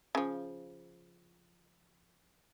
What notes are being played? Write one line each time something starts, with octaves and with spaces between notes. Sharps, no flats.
C#3 F3